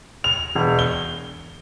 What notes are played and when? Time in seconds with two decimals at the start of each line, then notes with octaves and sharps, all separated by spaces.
0.24 F7
0.55 E1
0.79 G7